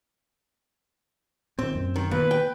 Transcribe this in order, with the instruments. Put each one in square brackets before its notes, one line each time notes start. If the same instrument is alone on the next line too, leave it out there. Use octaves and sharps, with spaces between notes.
[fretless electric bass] A#2 D#3 [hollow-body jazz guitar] C4
[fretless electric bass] F#2
[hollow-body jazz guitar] D#3
[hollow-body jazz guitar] A#2 [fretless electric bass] D#3 B3 [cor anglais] B4
[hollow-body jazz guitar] G5